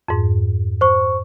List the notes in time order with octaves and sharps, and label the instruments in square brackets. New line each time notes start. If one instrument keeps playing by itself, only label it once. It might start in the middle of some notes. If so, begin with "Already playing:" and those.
[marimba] F2 G#2
[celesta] C5 C#6